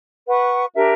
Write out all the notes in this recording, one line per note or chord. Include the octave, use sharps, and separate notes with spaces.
B4 F#5 C#6
D4 G4 A#4 E5